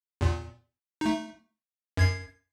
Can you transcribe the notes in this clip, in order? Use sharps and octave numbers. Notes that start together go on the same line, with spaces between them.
E2 A#2
A3 D#4
F#2 G#6 C7